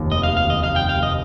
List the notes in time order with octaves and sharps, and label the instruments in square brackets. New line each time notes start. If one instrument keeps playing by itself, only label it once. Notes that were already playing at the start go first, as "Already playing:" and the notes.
Already playing: [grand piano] F1 D#2 D#3
[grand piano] F1 [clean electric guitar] D#5
[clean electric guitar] F5
[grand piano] D#2
[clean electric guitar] F5
[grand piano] D#3 [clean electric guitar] D#5
[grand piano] F1 [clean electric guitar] F5
[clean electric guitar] G5
[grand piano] F1
[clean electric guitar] F5
[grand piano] F1
[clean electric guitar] D#5